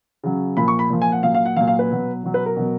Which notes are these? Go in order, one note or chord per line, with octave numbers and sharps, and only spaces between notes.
C#3 F#3
A#2 F3 B5
C#6
B5
A#2 F3
G#5
F#5
A#2 F#3 F5
F5
F#5
A#2 F#3 F5
F5
B4
B2 F#3
B2 F#3
B4
A#4
B2 F#3